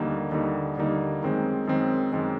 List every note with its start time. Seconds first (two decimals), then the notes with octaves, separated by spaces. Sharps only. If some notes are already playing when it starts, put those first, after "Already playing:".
Already playing: D#2 D3 G3 A#3 D#4
0.32 D#2 D3 G3 A#3 D#4
0.77 D#2 D3 G3 A#3 D#4
1.23 F#2 D#3 G#3 C4
1.67 F#2 D#3 G#3 C4
2.12 F#2 D#3 G#3 C4